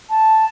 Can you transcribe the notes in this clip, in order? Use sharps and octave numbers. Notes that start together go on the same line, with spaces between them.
A5